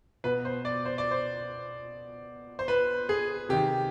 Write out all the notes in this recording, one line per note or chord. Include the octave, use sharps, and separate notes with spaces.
B2 B4
C5
D5
C5
D5
C5
C5
B4
G#4
C3 D#3 G4